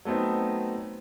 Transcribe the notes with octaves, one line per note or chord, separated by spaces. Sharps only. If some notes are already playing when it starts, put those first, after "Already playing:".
F#3 A3 B3 C4 D#4